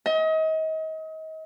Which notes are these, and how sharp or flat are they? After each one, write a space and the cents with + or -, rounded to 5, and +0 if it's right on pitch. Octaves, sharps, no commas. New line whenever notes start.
D#5 +35